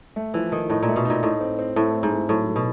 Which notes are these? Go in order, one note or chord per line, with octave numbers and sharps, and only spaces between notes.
A3
E3 F3
D#3 A3
A2 D#4
A#2
A3
B2
A#2 D#4
A2 D#4
C4
C4
A2 A3
C4
G#2
A3
A2 F#3
F#3
B2